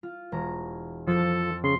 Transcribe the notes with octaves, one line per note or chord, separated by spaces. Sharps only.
F4
E1 A#5
F2 F3 A4 A6
C#3 C6